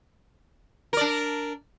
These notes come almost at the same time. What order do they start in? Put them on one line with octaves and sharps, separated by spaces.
A#4 D5 D4